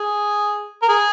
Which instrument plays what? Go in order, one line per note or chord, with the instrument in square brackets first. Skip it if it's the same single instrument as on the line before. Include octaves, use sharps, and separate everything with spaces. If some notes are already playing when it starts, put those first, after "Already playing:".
Already playing: [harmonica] G#4
A#4
G#4